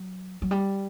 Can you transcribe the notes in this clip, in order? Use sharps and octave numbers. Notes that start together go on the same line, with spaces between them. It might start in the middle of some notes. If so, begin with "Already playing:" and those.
Already playing: F#3
F#3
G3